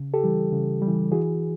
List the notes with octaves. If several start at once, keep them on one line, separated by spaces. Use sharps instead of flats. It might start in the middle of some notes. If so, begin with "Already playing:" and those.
Already playing: C#3
G4 A4
E3 G3
C#3
G3
E3
E3 F#4 G#4